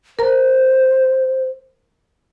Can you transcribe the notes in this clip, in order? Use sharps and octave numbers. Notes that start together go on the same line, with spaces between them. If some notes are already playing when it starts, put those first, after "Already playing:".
A#4 C5 A#5